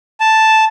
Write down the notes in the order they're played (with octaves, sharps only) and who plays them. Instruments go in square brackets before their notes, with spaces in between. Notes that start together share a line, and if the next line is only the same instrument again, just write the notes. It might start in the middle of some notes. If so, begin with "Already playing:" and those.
[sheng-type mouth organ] A5